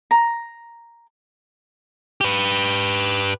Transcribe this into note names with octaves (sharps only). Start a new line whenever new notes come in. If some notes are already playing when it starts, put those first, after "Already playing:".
A#5
G4 B4